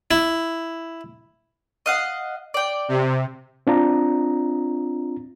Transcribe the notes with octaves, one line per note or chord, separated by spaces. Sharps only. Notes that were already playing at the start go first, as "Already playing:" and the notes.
E4
D#5 F5 F#5
D5 G5
C3
C4 D4 F4 A#5